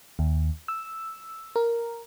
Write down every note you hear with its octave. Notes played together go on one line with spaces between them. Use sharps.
D#2
E6
A#4